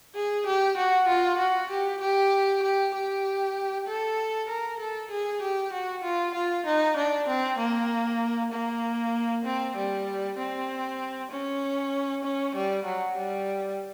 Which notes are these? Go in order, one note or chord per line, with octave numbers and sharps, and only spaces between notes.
G#4
G4
F#4
F4
F#4
G4
G4
G4
G4
A4
A#4
A4
G#4
G4
F#4
F4
F4
D#4
D4
C4
A#3
A#3
C4
G3
C4
C#4
C#4
G3
F#3
G3